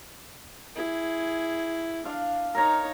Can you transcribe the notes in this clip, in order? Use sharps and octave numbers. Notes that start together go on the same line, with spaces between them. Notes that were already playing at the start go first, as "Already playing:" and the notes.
E4 G#4
D4 F5
D#4 A#4 C#5 A#5